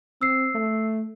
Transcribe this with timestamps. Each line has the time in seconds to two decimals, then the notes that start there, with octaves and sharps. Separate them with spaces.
0.21 C4 E6 C7
0.55 A3